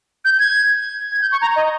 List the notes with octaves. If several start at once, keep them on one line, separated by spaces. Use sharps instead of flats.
G6
G#6
G#6
G6
C#6
A#5
D#5